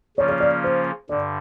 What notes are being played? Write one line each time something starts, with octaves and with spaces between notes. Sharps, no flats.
C#3 F3 A#3 C#4 F4 C#5
C#5
D5
C5
G2 D3 D5